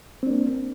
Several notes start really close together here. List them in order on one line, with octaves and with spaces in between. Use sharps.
C4 D4 A#3